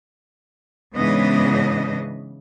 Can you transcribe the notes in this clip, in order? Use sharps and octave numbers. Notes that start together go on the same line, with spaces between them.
G#2 C#3 E3 B3 D4 D#5